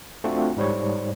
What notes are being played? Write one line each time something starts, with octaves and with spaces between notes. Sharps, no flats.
A3 C4 D4 F4 F#4
G#2 G3 C5 C#5